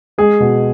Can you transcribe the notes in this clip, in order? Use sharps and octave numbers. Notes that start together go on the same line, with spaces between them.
G#3 G#4
B2